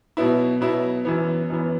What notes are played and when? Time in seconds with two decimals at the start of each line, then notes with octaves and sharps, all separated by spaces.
0.17 B2 F#3 B3 E4
0.61 B2 F#3 B3 E4
1.05 F#2 E3 B3
1.50 F#2 E3 B3